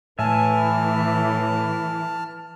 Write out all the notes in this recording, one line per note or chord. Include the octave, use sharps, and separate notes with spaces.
A2 E3 E5 G#5 A5 F6